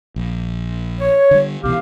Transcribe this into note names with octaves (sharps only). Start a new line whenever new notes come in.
A#1
C#5
D3 G3
C2 B2 E3 G4 F5